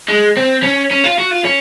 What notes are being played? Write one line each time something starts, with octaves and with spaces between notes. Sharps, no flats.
G#3
C4
C#4
C#4
F4
F#4
F4
C#4